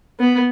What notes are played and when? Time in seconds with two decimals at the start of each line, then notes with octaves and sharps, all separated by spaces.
0.20 B3